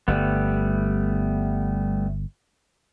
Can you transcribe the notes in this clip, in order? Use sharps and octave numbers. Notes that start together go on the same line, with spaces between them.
G1 G3 A3 B3